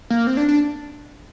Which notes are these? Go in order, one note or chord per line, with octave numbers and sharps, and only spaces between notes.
A#3
C4
D4
D4